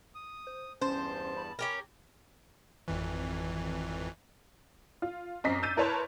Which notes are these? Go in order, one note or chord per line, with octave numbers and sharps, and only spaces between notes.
D#6
C5
E2 G2 C#4 C5 A5
B5
C#4 G4 A#4
G#1 F2 E3
F4
F#2 C4 D#5 D6 B6 C7
E6 G6 A6 D#7
E4 A#4 B4 C#5 A5 C6